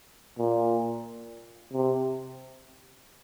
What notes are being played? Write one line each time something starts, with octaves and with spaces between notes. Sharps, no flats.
A#2
C3